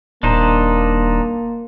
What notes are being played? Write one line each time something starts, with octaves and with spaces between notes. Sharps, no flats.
D#1 A#3 D4 D#4 C5